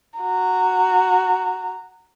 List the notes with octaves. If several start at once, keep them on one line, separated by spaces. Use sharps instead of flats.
F#4 A#5